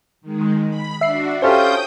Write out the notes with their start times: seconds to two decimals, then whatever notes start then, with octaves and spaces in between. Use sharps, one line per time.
0.21 D#3 G#3
0.68 B5
1.01 D4 F#4 E5 C7
1.42 C#4 F4 G4 A4 C5 G5 D#6 G6